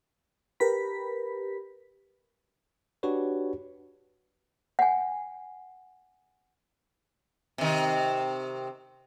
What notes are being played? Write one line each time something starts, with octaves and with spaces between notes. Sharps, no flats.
G4 A#4 B4 B5 B6
D4 F#4 G4 B4 C#5
F#5 G#5
C3 D#3